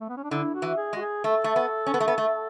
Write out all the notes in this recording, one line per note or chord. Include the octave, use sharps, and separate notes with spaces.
A3
B3
C#4
D4
D3 E4
F#4
E3
G#4
G#3 F#4
G#4
A3 A4
A3
B3
C#4
B3
A3
B3
A3